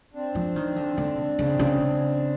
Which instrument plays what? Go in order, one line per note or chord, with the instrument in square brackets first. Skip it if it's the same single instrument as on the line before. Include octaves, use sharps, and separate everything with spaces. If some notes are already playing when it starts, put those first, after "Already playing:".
[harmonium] C4 D4
[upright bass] F3
D#3
D3
D3
C#3
C#3